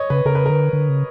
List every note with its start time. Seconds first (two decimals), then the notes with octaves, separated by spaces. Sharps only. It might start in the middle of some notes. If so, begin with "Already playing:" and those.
Already playing: C#5 D#5
0.10 C#3 B4
0.25 C#3 A#4
0.35 B4
0.46 D3 A#4
0.73 D3
0.89 C#3